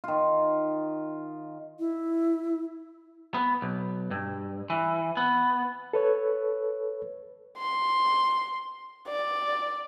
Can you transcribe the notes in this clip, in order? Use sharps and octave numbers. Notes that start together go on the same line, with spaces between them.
D#3 F4
E4
B3
B1
G2
E3
B3
A4 B4 C#5
C6
D5